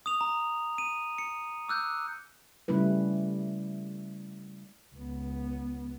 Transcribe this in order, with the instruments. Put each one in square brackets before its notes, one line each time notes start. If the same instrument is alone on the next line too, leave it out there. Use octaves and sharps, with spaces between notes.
[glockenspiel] D#6 F7
A#5
D#7
C#7
D6 E6 F#6 G6
[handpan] C#3 G3 A3 C#4 E4 B4
[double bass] C#2 B3